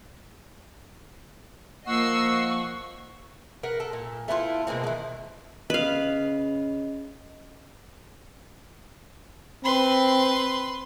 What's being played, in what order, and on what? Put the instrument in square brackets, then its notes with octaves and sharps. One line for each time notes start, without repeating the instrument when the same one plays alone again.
[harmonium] F3 F#5 [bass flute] A#3 [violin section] D#5 E6 C7 [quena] C#6
[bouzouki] A#4 B4 F#5
A4
A#2
A3 B3 E4 F4
B2 G#3 A#3 C4
D#3 E3
[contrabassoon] C#3 [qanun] B4 F5 [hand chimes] D#5
[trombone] C4 [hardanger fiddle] B4 C6